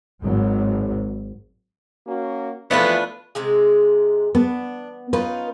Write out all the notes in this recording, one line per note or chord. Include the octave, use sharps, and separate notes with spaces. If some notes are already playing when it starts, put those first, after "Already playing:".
G#1 F#3
A#3 C#4 F#4
F2 E3 F3 A3 B3 D4 F4 B4
C3 G#3 G#4
B3 D4
C#4 D#4 F4 B4